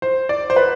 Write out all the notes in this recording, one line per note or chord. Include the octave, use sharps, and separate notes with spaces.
C5
D5
C5
B4